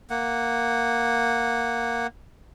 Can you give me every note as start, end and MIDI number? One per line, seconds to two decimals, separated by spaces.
0.10 2.07 58
0.10 2.07 78